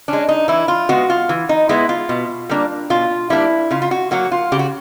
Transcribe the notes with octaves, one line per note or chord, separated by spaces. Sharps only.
G#3 C#4 D4
D#4
E3 E4
F4
G#3 B3 F#4
F4
E3
D#4
G#3 B3 E4
F4
B2
G3 A#3 D4
B2 F4
G3 A#3 D4 E4
C#3 F4
F4
F#4
F#3 A#3 F#4
F4
C#3 G4
F#4